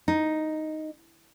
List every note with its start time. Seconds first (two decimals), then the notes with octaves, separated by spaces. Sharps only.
0.08 D#4